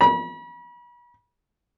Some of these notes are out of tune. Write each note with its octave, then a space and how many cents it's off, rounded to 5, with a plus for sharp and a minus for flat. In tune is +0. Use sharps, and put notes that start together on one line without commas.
B5 -40